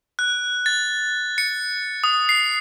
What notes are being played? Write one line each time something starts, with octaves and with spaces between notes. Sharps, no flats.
F#6
A6
C#7
D#6
C7